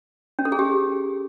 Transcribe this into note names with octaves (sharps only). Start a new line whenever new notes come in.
C#4
A4
G#4
G4